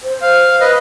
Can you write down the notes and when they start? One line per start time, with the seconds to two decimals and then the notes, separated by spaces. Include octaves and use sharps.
0.03 C5
0.22 F5
0.61 B4 D#5